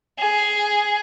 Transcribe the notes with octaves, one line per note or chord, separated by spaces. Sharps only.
G#4